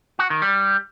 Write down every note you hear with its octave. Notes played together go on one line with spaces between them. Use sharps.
F#4
D#3
G3